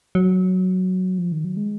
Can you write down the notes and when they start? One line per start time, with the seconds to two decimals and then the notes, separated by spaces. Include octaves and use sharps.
0.15 F#3
1.18 F3
1.32 D#3
1.45 F#3
1.57 G#3